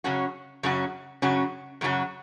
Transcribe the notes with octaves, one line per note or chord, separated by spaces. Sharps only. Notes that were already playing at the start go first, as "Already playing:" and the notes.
F#2 C#3 F#3 C#4 F#4
F#2 C#3 F#3 C#4 F#4
F#2 C#3 F#3 C#4 F#4
F#2 C#3 F#3 C#4 F#4